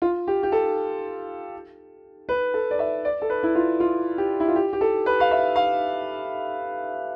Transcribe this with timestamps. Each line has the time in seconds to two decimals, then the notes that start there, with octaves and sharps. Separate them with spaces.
0.02 F4
0.28 G4
0.43 G4
0.52 A4
2.29 B4
2.54 A4
2.71 D5
2.79 E5
3.05 D5
3.22 A4
3.30 B4
3.43 E4
3.55 F4
3.80 F4
4.18 G4
4.40 E4
4.48 F4
4.56 G4
4.73 G4
4.81 A4
5.06 B4
5.20 F5
5.31 E5
5.56 F5